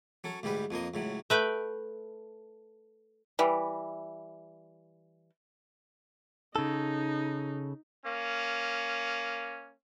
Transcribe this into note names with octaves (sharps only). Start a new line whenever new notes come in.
F#3 C#4 A4
D2 G#2 G3 G4 B4
F2 F3 A#3 D#5
C#2 A2 F#3
A3 B4 G5
E3 G3
C#3 D#4 A4
A#3 C#4